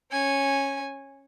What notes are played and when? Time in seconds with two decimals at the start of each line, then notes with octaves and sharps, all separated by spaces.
0.11 C#4 G#5